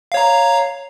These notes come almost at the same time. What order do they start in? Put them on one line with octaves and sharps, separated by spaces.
F5 C#5 A#5